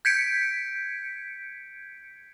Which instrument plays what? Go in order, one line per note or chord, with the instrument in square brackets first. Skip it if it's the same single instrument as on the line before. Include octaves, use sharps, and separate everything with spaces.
[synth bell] G6 G#6 B6 C#7 D7